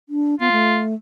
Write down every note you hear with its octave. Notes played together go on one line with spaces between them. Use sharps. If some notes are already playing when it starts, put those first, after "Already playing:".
D4
B3 F4
A3